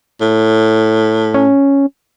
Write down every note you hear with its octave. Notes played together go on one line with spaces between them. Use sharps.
A2
C#4